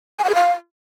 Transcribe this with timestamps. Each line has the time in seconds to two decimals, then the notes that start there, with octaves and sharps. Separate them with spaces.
0.19 G#5
0.24 F#5
0.29 G#4
0.35 F5